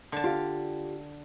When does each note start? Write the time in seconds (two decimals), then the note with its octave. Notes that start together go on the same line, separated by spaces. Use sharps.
0.12 D3 A5
0.24 F4 G4 F5